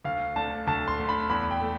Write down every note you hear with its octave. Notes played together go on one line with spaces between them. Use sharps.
D2 F5
D3 A3 A5
D2 A5
C6
D3 A3
B5
E2 B5
G5
A3